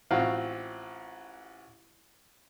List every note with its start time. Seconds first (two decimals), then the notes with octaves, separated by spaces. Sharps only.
0.11 A1 C4 F4 F#4 F5